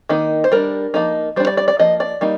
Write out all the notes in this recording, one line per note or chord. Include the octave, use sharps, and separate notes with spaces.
D#3 A#3 D#4
C5
G3 D4 A#4
F3 A#3 D#4
G3 D4 C5
D5
D5
D5
F3 A#3 D#5
D5
G3 A#3 D#4